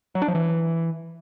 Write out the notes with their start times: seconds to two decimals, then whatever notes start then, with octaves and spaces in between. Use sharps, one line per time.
0.15 F#3
0.22 D4
0.28 F3
0.35 E3